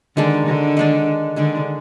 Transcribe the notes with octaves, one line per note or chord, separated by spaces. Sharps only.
D3 D#3 G#3 D4
D3
D#3 G#3 D4
D3 D#3 G#3 D4